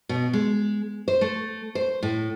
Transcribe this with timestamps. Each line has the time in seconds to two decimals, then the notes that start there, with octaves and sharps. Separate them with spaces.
0.09 B2
0.33 G#3
1.08 C5
1.21 A3
1.75 C5
2.03 A2